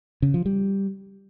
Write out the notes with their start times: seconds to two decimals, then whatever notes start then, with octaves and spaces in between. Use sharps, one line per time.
0.22 C#3
0.34 F3
0.46 G3